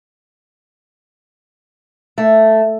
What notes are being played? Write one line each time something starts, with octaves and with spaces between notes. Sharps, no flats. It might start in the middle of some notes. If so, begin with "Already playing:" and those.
A3